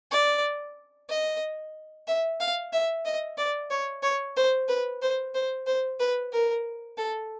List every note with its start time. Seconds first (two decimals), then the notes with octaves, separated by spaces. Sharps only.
0.11 D5
1.09 D#5
2.07 E5
2.40 F5
2.73 E5
3.05 D#5
3.38 D5
3.70 C#5
4.03 C#5
4.36 C5
4.68 B4
5.02 C5
5.34 C5
5.66 C5
6.00 B4
6.33 A#4
6.97 A4